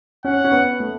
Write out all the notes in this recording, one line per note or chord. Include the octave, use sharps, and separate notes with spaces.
C#4 F#5
C#4
B3
A3